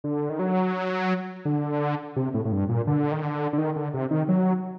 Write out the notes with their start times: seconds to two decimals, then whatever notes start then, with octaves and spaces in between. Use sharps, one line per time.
0.04 D3
0.30 D#3
0.39 F#3
1.45 D3
2.16 C3
2.34 A2
2.45 A2
2.52 G2
2.69 A#2
2.87 D3
3.12 D#3
3.23 D3
3.53 D3
3.58 D#3
3.76 D3
3.94 C3
4.11 D#3
4.28 F#3